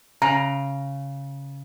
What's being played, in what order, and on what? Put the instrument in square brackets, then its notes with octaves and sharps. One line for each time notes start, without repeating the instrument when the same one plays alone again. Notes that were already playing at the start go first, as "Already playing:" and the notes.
[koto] C#3 [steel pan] A#5